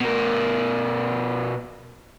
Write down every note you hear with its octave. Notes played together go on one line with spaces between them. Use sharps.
B2 A#4